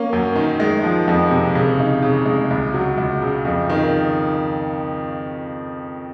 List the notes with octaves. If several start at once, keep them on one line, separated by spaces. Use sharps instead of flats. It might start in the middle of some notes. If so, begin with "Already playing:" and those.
Already playing: A#3 C#4
F#2
D#3
G#3
F3
F2
C3
C#3
D#4
C#3
G#3
C#2
F#3
C#2
C#3
F2
D#3